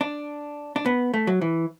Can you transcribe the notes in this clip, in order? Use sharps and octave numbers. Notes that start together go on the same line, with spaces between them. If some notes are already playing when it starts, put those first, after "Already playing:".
D4
D4
B3
A3
F#3
E3